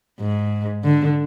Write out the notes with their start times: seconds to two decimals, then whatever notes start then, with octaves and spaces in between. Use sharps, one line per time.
0.20 G#2
0.84 D3